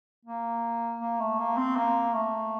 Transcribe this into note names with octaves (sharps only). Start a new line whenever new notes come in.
A#3
A#3
A3
A#3
C4
A#3
A3